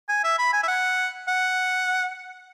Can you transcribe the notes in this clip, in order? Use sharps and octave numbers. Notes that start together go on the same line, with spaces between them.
G#5
E5
B5
G#5
E5
F#5
F#5